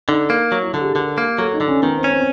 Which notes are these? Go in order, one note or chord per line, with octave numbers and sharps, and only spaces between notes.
D3 D#4
A#3
F#3
E4
D3 A4
G4
G#4
D3 A#4
A#3
F#3 A4
D#4
D3
C#4
D#3 B3
C4
C#4
C4